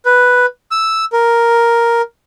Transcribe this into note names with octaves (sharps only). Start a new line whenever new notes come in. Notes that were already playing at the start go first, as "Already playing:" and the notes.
B4
E6
A#4